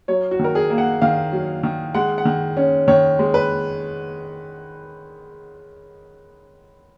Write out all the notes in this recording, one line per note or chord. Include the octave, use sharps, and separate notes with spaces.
F#3 C#5
F#4
D#3 A#4
G#4
A#3
F#5
D#3 F5
F#3
D#3
G#3 F#5
F#5
D#3
C#4
D#3 C#5
G#3
B4